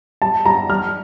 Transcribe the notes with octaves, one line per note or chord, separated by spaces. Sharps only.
G3 A5
G3 A#5
G3 F6